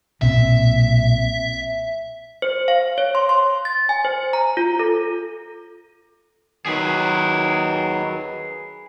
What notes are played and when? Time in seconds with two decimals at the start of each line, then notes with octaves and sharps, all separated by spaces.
0.22 B1 A#2 C4 E5
2.42 C5
2.68 F5
2.98 C#5
3.15 C6
3.29 C6
3.65 A6
3.89 G#5
4.05 C5
4.33 A#5
4.57 F4
4.79 A4
6.66 D#3 F#3 G#4 B4